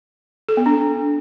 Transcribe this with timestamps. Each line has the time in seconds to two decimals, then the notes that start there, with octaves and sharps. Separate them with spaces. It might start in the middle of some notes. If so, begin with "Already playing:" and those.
0.49 A4
0.57 B3
0.66 D4